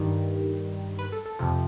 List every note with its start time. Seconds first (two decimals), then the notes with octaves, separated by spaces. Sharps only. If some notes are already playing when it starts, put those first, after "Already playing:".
Already playing: G2 D#3 G3
0.99 B4
1.12 A4
1.26 A4
1.39 F2 C3 F3